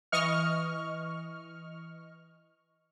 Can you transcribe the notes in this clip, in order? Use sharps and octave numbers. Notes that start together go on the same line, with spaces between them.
E3 D#5 C#6 F6